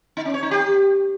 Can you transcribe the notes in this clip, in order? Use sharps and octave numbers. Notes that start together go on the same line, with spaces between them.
D#4
C#4
C#5
D#4
G4